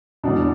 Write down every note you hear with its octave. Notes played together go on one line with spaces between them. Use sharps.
E2 B2 D4